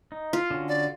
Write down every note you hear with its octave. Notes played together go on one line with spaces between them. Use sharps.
D#4
F4
D3 C#4 F#4
D5